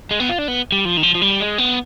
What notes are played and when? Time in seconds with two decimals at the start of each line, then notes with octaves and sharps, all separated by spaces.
0.11 G#3
0.20 B3
0.29 F4
0.38 D4
0.48 B3
0.72 G3
0.85 F3
0.97 D#3
1.03 F3
1.15 F3
1.22 G3
1.40 G#3
1.58 B3